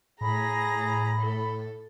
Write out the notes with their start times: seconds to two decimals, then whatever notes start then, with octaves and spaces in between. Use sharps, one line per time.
0.21 A2 G#4 A#5 B5 A#6
1.20 A4